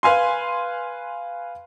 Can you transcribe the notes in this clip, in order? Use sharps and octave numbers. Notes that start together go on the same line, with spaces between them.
B4 F5 G#5 C6